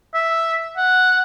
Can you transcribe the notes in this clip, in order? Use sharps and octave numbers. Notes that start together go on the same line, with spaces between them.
E5
F#5